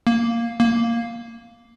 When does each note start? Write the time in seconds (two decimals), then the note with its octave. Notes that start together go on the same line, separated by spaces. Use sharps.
0.07 A#3
0.60 A#3